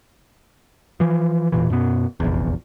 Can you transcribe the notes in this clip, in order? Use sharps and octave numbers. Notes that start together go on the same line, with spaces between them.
E3 F3
E1 A#2 E3
F#2 B2 B3
F1 A#1 E2